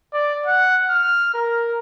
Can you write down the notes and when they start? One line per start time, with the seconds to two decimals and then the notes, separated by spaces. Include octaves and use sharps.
0.13 D5
0.46 F#5
0.90 F6
1.34 A#4